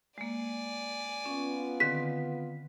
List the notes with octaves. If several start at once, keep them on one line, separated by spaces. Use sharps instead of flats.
G#3 A#3 D5 G#5
B3 C#4 F4
D3 D#3 C4 B6